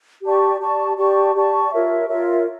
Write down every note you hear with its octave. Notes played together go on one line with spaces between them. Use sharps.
G4 D5 A5 C#6
G4 D5 A5 C#6
G4 D5 A5 C#6
G4 D5 A5 C#6
F4 A#4 C#5 E5
F4 A#4 C#5 E5